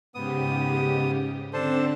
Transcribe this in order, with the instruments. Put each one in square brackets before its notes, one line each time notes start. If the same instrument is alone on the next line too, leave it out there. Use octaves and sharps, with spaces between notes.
[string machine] G#2 C#3 G4 [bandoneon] B3 D#6
[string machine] D3 C4 [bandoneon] D4 A4 C5